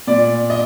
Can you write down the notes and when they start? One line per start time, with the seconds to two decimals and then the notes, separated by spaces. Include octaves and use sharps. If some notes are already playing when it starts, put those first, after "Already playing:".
0.07 A#2 D5
0.50 D#5